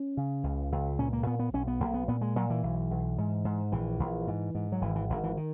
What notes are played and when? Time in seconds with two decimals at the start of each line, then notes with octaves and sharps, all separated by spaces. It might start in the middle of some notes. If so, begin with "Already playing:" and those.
Already playing: C#4
0.17 C#3
0.44 C#2
0.72 C#2
0.99 A#2 C#4
1.13 A#3
1.26 A#2 B3
1.39 B3
1.53 B1 C#4
1.67 B3
1.80 B1 A#3
1.94 B3
2.08 A#2 B3
2.21 G#3
2.36 A#2 F#3
2.50 E3
2.63 B1
2.91 B1
3.18 G#2
3.45 G#2
3.72 A#1 E3
3.99 A#1
4.27 G#2
4.55 G#2
4.72 F#3
4.82 G#1 E3
4.95 E3
5.10 G#1 D#3
5.24 E3
5.37 D#3